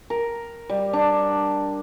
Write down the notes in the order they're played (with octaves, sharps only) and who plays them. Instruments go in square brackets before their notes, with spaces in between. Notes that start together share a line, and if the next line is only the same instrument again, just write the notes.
[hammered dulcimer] A#4
G3
D4